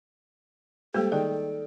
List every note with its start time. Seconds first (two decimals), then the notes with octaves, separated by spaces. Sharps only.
0.94 G3 G#3 A#3 G4 A4 C5
1.12 D#3 G#4 D5 G5